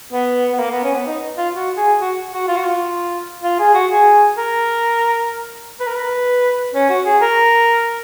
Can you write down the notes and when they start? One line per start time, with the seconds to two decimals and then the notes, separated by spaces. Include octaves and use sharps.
0.12 B3
0.53 B3
0.59 A#3
0.71 B3
0.84 C#4
0.95 B3
1.07 D#4
1.38 F4
1.54 F#4
1.77 G#4
2.01 F#4
2.33 F#4
2.48 F4
2.56 F#4
2.63 F4
3.43 F4
3.59 G#4
3.74 F#4
3.90 G#4
4.38 A#4
5.80 B4
5.87 A#4
5.95 B4
6.75 C#4
6.89 F#4
7.05 G#4
7.21 A#4